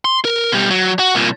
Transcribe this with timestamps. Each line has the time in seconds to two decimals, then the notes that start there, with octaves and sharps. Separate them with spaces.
0.05 C6
0.25 A#4
0.52 B2 G3
0.71 F#3
0.99 F#4
1.15 C2 A#2